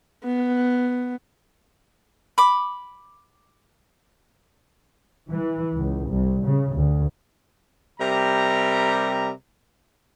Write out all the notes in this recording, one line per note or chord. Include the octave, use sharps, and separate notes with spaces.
B3
B5 D6
E3
C#2
C2
C#3
D2
C3 G3 A#4 A#5